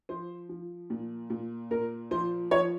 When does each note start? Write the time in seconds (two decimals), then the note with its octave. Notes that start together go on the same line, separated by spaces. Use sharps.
0.09 F3 C5
0.49 F3
0.90 A#2
1.30 A#2
1.71 A#2 A#4
2.11 F3 C5
2.51 F3 C#5